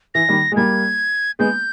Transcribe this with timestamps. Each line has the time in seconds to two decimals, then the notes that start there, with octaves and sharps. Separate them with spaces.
0.15 E3 A#6
0.29 D#3 G3
0.52 G#3
0.56 G3 A#3 G#6
1.39 G#3 B3 G6